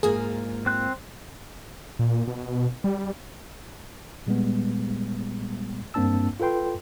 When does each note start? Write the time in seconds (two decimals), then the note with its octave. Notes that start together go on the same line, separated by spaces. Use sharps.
0.03 G#2 A#3 F4 G#4
0.66 C4 F#6
1.99 A#2
2.28 B2
2.84 G3
4.27 A#2 G3 G#3 B3
5.94 G2 A#3 C4 D4 A5 E6
6.40 F4 A4 B4 G5 C6